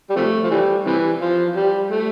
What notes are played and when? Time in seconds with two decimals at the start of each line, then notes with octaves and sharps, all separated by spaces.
0.10 G3
0.16 C3 F3 A3
0.44 F3
0.51 E3 G3
0.86 C3 E3
1.21 F3
1.56 G3
1.91 A3